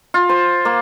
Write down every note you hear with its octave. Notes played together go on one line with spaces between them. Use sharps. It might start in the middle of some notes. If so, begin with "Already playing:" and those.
F4
C5
A#3